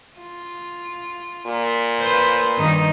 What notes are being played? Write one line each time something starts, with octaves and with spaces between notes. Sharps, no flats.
F4
A#2
B4 C5
G2 D#3 D#4